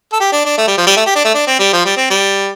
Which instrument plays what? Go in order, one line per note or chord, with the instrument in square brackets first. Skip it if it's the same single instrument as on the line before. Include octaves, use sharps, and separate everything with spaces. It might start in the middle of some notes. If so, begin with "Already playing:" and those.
[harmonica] A4
G4
D4
D4
A3
G3
F3
G3
A3
G4
D4
A3
D4
C4
G3
F3
G3
C4
G3